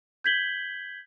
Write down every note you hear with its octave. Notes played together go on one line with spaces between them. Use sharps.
G6 G#6 B6 F#7 G7